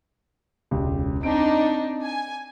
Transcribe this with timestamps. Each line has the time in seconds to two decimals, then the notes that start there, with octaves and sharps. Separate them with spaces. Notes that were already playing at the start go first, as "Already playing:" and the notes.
0.71 E1 C#2 G4
1.23 C4 D4 D#4 D7
2.01 G#5